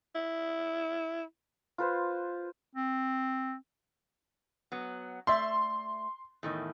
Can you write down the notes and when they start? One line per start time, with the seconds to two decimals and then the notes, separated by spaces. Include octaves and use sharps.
0.15 E4
1.78 F4 B4 C5
2.76 C4
4.72 F#3 B3
5.27 A3 D5 E5 C6
6.43 E2 A2 D#3